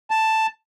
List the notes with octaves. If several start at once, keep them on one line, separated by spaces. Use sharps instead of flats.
A5